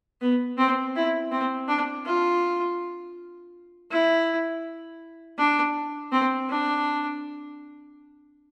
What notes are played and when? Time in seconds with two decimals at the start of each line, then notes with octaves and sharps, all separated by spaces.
0.21 B3
0.58 C4
0.96 E4
1.31 C4
1.68 D4
2.06 F4
3.91 E4
5.38 D4
6.12 C4
6.50 D4